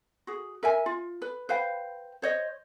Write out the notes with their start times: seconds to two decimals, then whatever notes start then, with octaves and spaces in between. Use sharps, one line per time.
0.27 F#4 G#4
0.63 A#4 E5 G#5
0.86 F4
1.22 B4
1.49 B4 C5 F5 G5
2.22 C5 C#5 D#5